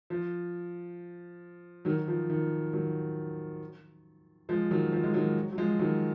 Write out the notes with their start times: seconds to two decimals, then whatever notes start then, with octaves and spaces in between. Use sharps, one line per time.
0.10 F3
1.85 D#3 F#3
2.08 F3
2.30 D#3
2.73 D#3 F#3
4.49 F3 G#3
4.71 D#3 F#3
4.92 F3
5.04 G#3
5.14 D#3 F#3
5.52 F#3
5.58 F3 G#3
5.79 D#3 F#3